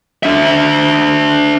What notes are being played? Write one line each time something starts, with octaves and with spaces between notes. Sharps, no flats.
D4 E5